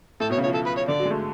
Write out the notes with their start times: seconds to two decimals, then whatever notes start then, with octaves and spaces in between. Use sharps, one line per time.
0.20 A2 A4
0.30 B2 C#5
0.38 C#3
0.43 F3 C#5
0.54 A4
0.66 B4
0.77 C#5
0.88 D3 D5
0.99 F#3
1.05 G#3
1.10 A3